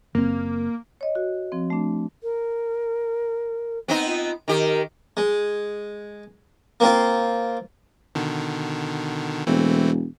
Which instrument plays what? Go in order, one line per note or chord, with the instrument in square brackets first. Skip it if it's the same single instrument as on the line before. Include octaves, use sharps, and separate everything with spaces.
[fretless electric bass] F#1 C4 [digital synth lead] A#3
[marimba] C#5 D#5
F#4
F3 C4
A3 D4
[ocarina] A#4
[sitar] B3 C4 D#4
[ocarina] F4
[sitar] D#3 G4 [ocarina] A#4
[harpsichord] G#3
A#3 C4 F4
[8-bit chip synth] B2 D3 D#3
[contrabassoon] E1 [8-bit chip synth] E3 A3 C4